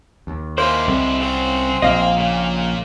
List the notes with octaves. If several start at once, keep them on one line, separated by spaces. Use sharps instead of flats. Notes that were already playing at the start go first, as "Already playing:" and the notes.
D#2
G#3 A#3 E4 C5
C2 D3
C#3 C4 F#4
A#1 A#3 D#5 F5
A#2 C#3 A#3